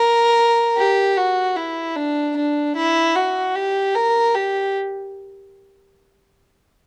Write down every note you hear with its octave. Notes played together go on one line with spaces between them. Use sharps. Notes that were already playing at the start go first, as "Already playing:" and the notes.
Already playing: A#4
G4
F#4
E4
D4
D4
E4
F#4
G4
A#4
G4